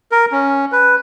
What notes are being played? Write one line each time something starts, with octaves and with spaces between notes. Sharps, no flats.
A#4
C#4
B4